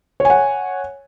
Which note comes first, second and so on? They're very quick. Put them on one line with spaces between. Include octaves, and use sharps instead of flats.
C#5 G#5 F#5